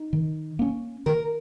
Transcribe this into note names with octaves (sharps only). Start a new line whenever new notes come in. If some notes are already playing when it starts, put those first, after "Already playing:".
Already playing: D#4
D#3
A#3 C#4
D#3 A#4